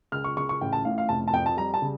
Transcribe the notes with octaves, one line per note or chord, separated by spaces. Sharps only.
C#2 F6
C#6
C#3 C#6
C#6
A1 G5
A5
A2 F5
F5
F1 A5
A5
F2 G5
A5
G3 A#5
A5
C#3